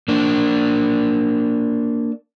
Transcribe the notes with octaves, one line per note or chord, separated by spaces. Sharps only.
A#3 D4